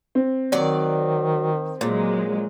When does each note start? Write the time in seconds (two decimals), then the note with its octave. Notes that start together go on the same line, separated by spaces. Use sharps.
0.15 C4
0.52 D#3 F#3 D5
1.81 A#2 F#3 G#3